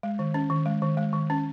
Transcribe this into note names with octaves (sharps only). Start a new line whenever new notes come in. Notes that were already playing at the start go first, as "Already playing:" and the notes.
G#3
D#3
C#4
D#3
G#3
D#3
G#3
D#3
C#4